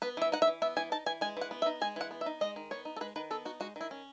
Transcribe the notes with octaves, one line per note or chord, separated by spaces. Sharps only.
B3 B4
E3 E5
D#4 F#5
E5
E3
B3 E5
E3 G#5
D#4 A5
E3 G#5
G#3 G#5
E3 F#5
B3
E5
D#4
G#3 G#5
E3 F#5
B3
E5
D#4
G#3 D#5
D#3
B3 C#5
D#4
A4
G#3 B4
D#3 B4
B3 A4
D#4 F#4
G#3 F#4
D#3 E4
C#4